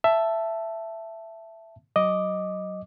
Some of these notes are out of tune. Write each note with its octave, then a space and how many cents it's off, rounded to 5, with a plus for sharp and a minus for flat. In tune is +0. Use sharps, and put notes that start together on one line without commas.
E5 +10 A5 +0
F#3 +20 D#5 +0 D6 +0